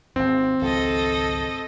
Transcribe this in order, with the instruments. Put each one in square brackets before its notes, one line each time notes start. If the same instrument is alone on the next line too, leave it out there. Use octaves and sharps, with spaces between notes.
[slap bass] G#1 D#2 [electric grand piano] C4
[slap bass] G#1 C#2 F3 [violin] A4 D#5